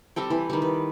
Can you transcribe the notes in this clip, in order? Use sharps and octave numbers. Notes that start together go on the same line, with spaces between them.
G3 C4 A4 G5
E3 B5
D#3 G3
B4